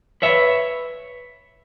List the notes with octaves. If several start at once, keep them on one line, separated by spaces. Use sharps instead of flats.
B4 C#5 E5